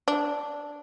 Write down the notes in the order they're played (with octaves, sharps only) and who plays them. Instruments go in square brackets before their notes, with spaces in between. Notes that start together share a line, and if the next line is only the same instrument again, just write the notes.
[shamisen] D4